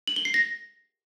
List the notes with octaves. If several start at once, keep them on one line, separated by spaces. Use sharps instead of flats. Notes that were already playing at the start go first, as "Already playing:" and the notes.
F#7
G7
C7
A#6